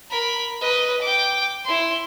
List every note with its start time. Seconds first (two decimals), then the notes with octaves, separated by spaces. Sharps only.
0.10 A#4 B5
0.61 B4 D#5
1.02 G5 D6
1.64 E4 C6